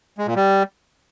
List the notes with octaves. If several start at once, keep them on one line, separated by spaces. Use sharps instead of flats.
G#3
A#2
G3